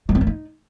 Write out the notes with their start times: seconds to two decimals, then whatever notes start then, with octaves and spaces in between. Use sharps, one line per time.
0.09 G3
0.15 C4
0.21 A#3
0.27 D#4